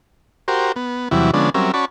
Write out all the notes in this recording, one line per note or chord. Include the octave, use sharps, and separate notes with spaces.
F#4 G4 A#4 C5
B3
E2 C3 E3 F#3 G3 E4
D3 F3 G#3 B3 C#4 D4
F#3 G3 C4 C#4 A#4 E5
C#4 F#4 D5 A5 B5 C#6